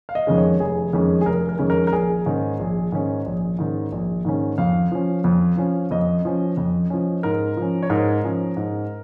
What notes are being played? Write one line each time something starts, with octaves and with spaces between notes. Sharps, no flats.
F5
D#5
F2 D#3 G#3 C#4
C#5
F1 G#4
F2 D#3 G#3 C#4
G#4
F1 A#4
A#4
F2 D#3 G#3 C#4
A#4
A#4
A#1 G#4
G#2 D#3 C#4
A#1
G#2 D#3 C#4
A#1
G#2 D#3 C#4
A#1
G#2 D#3 C#4
F2 F5
F3 C#4
F2
F3 C#4
F2 D#5
F3 C#4
F2
F3 C#4
G#2 A#4
F3
C#4
C#5
G#2 A#4
F3 C#4
G#2